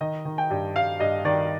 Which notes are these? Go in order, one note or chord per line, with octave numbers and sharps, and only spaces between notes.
D#3 D#5
D#3
G5
G2
G2 F5
G2 D#5
D#3 D5